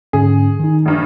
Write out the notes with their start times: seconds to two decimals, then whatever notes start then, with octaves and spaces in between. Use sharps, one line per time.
0.13 G#2 D3 C#4 G#4
0.60 D#3 D#4
0.86 A#1 G2